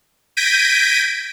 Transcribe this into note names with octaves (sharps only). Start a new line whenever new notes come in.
G6 G#6 A#6 B6 D7 D#7